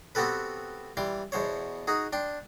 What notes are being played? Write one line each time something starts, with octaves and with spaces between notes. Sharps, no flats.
B3 C4 F#4 G4 A4 B4
E3 G3 C6 D6
E2 B2 C5 C#5
D#4 F#4 G#4
D4 G5 C6